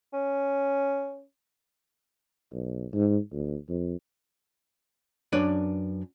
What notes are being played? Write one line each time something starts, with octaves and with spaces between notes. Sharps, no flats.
C#4
B1
G#2
D2
F2
F#2 D4 B4 C#5 D5